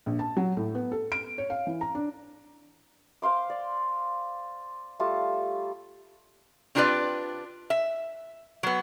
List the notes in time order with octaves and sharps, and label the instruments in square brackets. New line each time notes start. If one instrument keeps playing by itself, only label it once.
[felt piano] A#1
A5
F#3
A2
B3
A4
D7
C#5
F5
E3
A#5
D4
[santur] C5 F5 C6 D6
D5
G3 A3 F4 A5
[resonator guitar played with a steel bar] C4 D4 F4 G4 B4 D5
E5
F#3 B3